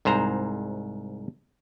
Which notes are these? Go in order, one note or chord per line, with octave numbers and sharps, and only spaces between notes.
C2 G#2 C5 A#5